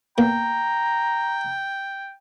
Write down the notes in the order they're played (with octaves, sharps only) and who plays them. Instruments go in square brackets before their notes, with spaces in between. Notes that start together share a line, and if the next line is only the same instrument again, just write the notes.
[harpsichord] A#2 A#3 B3 [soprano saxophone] G5 [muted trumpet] A#5